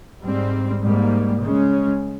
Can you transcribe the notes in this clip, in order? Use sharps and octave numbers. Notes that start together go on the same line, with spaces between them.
G#2 G3 C4
G#2 G3 A#3
C#3 G#3 C#4